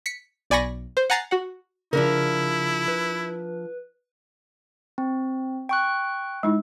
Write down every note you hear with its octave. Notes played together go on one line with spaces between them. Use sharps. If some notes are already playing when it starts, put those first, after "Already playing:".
B6 C#7
B1 D5 G#5 B5 C#6 A#6
C5
F#5 G#5 A#5 A6 C7
F#4 F#5
C#3 F3 D4 E4 A#4
B4
C4
G5 C#6 F#6
G#3 D#4 E4